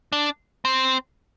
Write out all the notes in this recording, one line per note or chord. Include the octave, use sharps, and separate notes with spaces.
D4
C4